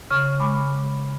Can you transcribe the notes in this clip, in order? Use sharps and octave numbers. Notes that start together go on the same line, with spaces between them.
C#3 C#6 F6
G#3 B5 D6